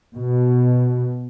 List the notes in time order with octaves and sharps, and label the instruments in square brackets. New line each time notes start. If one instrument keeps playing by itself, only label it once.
[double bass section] B2